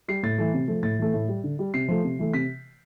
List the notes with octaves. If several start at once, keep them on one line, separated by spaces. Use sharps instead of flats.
G3 C7
A2 A6
E3 A3
C3
F3 A3
A2 A6
E3 A3
A2
G3
D3
G3
C3 C7
F3 A3
C3
E3 A3
C3 B6